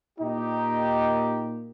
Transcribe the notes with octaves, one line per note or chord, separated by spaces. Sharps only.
A#2 D#4 G4